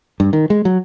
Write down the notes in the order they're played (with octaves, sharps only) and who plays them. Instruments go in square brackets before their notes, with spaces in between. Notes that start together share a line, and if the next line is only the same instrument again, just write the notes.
[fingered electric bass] G2
D#3
G#3
F#3